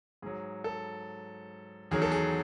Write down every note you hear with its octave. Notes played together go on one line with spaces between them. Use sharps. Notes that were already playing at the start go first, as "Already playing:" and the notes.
G#2 F#3 G#4
A4
E2 D#3 F#3 G#4
A4
G#4